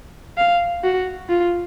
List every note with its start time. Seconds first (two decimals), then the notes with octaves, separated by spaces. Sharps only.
0.38 F5
0.84 F#4
1.29 F4